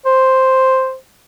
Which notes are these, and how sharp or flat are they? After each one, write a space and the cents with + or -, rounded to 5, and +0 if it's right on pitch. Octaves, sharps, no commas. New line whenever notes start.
C5 +0